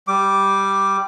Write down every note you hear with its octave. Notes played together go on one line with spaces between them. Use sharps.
G3 D6